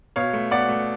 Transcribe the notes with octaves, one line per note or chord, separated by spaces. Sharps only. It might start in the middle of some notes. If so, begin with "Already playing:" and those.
B2 C#5 F5
A3
B2 D5 F#5
A3